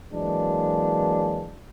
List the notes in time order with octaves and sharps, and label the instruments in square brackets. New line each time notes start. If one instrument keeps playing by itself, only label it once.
[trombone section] E3 F#3 G#3 A#3 D4